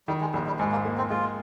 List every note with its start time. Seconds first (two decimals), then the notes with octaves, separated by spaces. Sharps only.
0.08 D#3 G3
0.21 G#3
0.33 A#1 G3
0.47 G3
0.59 G#2 G#3
0.72 A#3
0.85 A#3
0.98 C4
1.10 G#3 F4